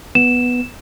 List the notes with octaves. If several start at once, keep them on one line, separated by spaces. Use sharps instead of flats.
B3 E7